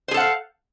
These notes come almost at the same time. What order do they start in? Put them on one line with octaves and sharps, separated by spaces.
C5 G#4 A4 F#5 F5